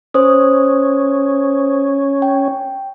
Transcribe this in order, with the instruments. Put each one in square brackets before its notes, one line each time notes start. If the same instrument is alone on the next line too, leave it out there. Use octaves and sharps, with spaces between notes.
[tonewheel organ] C#4 [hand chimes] C5 D#6
[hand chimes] G5